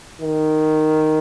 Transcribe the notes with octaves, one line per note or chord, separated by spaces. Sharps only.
D#3